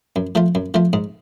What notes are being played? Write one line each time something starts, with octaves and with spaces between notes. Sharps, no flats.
F#2
F3 A3 F4
F#2
F3 A3 F4
G#2